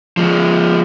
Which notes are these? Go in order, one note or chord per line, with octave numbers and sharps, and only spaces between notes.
F3 G#3